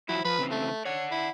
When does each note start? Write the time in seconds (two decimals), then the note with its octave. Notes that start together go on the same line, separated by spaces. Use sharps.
0.09 F3 F#3 E4 F#4
0.25 F3 B4
0.38 C#3 E3 C4
0.51 A3
0.85 C#5 D5 F#5
1.11 E4